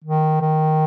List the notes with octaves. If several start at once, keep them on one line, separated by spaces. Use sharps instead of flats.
D#3
D#3